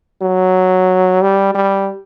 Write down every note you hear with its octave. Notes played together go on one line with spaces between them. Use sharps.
F#3
G3
G3